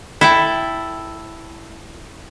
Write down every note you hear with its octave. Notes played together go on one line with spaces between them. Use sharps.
E4 A4 G5